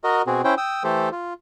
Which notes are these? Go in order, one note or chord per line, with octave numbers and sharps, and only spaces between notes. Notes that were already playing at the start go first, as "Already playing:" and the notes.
F#4 A#4 D#5
B2 C4 F#4 G#4
C#4 E4 C5 G5
G5 D#6 E6
E3 A3 G4 A4 C5
F4